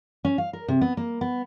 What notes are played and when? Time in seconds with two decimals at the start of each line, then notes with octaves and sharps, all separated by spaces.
0.25 C#4
0.38 F5
0.53 A#4
0.68 C3
0.81 B3
0.97 A#3
1.21 B3